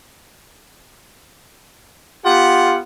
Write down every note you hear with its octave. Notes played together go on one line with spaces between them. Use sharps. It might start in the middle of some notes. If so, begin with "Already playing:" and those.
B3 F4 G4 F#5